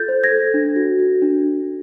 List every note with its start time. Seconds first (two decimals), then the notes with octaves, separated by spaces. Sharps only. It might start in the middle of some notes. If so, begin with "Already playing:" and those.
Already playing: F4 A4 G6 A6
0.08 C5
0.23 G#6 A#6
0.31 A4
0.54 D4
0.76 F#4
0.99 F#4
1.22 D4